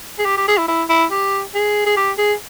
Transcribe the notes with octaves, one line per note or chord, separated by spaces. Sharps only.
G#4
G4
G4
G#4
E4
E4
E4
G4
G#4
G#4
G4
G#4